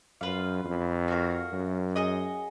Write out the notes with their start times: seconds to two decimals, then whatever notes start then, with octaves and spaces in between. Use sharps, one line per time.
0.21 F#2 F4 B4 F5
0.64 F2
1.08 F#4 A#4 F5
1.52 F#2
1.96 G#4 D#5 F#5